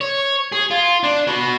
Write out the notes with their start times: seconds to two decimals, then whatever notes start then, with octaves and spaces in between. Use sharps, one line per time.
0.01 C#5
0.52 G#4
0.71 F4
1.03 D4
1.27 F#4 B5